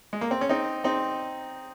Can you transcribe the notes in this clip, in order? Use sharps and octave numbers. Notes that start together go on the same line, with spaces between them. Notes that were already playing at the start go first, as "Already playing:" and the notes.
G#3
A#3
C4
C#4
C4 D#4
C4 D#4